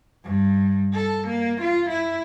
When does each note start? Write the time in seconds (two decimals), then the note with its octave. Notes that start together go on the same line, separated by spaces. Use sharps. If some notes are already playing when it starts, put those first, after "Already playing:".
0.25 G2
0.94 A4
1.28 A#3
1.62 F4
1.90 E4